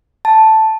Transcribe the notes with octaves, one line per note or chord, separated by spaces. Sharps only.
A5